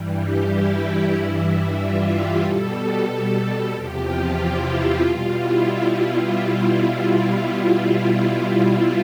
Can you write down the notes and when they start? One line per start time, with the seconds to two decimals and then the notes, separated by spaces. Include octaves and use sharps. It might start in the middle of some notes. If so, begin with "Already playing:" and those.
Already playing: G2 E3 G3
0.17 G4
0.50 E4
1.14 G2 E3 G3
1.79 F4
2.11 G4
2.43 B2 G3 A4
3.71 E2 C3 F3 G4
4.04 F4
4.36 E4
5.00 B2 G3 F4
5.32 E4